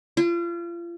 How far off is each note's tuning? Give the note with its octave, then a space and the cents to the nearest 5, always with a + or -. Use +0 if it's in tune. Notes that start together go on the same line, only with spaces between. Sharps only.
F4 -35